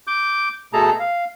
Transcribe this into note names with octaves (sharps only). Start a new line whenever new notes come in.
D6 G6
B2 A3 G#4 A4 A5 A#5
F5